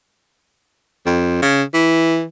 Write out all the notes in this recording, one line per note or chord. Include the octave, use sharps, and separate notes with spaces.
F2
C#3
E3